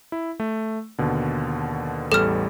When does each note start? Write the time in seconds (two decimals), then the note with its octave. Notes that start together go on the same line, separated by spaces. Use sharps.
0.12 E4
0.40 A3
0.98 D#2 B2 D3
2.12 A1 E2 G3 A4 F6